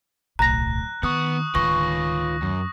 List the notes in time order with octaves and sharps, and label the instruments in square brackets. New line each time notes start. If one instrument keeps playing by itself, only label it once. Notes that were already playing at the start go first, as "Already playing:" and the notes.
[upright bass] D1 B1 [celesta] A#5 A#6 [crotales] F#6
[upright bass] D#3 [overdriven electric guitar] B3 [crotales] C#6 D#6 F#6
[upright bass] D1 D#3 [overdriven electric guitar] F4 B4 [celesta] C#6 [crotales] A#6
[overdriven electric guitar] F#2